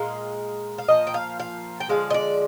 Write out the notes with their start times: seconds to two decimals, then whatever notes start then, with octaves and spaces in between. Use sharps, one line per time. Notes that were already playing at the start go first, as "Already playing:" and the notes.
Already playing: A#2 G#3 F5
0.78 F5
0.89 A#2 F3 D#5
1.07 G5
1.14 F5
1.40 F5
1.80 G5
1.89 D3 F3 G#3 F5
2.10 D#5
2.14 D5